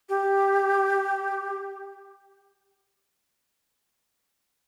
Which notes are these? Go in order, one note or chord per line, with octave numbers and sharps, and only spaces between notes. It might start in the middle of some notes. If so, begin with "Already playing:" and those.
G4